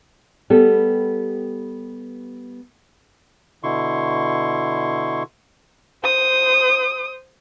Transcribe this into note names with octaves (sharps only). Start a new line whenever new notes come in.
G3 B3 G4 A4
B2 D3 E4 C6 C#6
C5 D#6